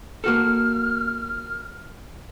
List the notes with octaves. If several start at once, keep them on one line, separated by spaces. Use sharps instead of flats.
A#3 F#4 A4 F6